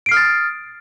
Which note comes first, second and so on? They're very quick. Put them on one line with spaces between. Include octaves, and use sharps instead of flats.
D7 C7 F6 D#6 A6